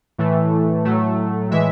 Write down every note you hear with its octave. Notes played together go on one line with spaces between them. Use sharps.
A2 E3 A3
A2 F#3 A3
A2 E3 G#3 E5